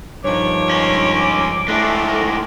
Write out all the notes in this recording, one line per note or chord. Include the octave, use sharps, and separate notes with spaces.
G2 D#3 F3 C#5 D6
G#3 C#4
A2 G#3 A3 D4
A#4